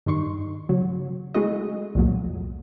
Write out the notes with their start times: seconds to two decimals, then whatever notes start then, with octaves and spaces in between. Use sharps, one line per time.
0.06 G2 D#3 C6 C#6
0.69 C#3 F#3
1.34 G#3 A3 E4 F#4 D#5
1.95 C2 F2 A#2 F#3